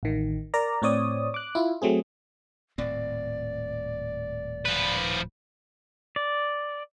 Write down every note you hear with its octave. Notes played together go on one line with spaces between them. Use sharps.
A1 D#3
A#4 D5 A#5
A2 C4 C#5 D5 D#6
D6 F#6
E4 F4
F#3 A3 C4 G#4
D#1 A2 C4 D5
F3 B4
D5